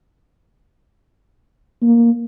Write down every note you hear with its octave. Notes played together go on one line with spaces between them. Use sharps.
A#3